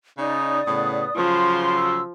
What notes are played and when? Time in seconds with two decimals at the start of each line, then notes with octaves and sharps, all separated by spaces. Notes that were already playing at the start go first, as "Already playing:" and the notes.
0.18 C#3 C#4 D#4 D5 D#6
0.68 A2 C#3 B3
1.16 C#3 F3 F#3 C6
1.75 E6